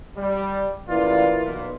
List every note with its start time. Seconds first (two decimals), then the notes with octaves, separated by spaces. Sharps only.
0.16 G3
0.89 A1 C3 E3 A#3 F4 D5
1.43 B1 A#2 B4